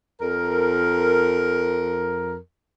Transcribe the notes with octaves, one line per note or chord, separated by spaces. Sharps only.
F2 A#4